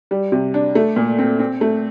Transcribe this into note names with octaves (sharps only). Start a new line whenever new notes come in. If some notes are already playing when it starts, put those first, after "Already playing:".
G3
C3
D4
A3
A#2
C4
C4
A3